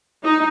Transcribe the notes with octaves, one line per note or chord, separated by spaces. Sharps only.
D#4